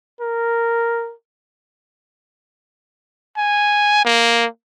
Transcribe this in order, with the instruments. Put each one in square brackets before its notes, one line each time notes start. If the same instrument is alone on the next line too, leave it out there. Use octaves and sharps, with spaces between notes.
[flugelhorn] A#4
[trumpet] G#5
A#3